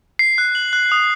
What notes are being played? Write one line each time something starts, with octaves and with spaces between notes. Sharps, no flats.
C7
F#6
F#7
F#6
D#6